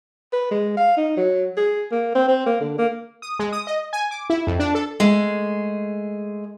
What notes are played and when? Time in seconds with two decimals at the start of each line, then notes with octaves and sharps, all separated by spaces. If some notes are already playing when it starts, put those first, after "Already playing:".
0.33 B4
0.51 G#3
0.77 F5
0.97 D#4
1.17 F#3
1.57 G#4
1.91 A#3
2.15 C4
2.28 C4
2.46 A#3
2.60 D3
2.78 A#3
3.22 D#6
3.39 G#3
3.52 D#6
3.67 D#5
3.93 G#5
4.11 D6
4.30 E4
4.47 F2
4.60 D4
4.75 A4
5.00 G#3 A3 G#4